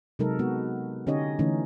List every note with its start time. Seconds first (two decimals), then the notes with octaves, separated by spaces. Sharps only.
0.19 C3 F#3 G#3 D#4 A4 A#4
0.39 G#3 B3 F#4
1.07 D3 C#4 D#4 G4 C#5 D#5
1.39 D3 E3 A3 C#4 D#4